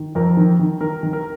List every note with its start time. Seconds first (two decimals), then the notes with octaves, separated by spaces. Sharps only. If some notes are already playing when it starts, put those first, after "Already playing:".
Already playing: D#3
0.15 F2 A#4
0.37 D#3
0.60 D#3
0.81 D#3 A#4
1.03 D#3
1.13 A#4